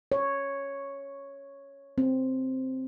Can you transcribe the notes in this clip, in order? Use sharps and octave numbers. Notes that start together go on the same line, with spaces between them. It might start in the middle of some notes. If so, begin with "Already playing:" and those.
C#5
C4